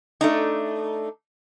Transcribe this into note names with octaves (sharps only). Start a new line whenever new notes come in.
A3 D4 D#4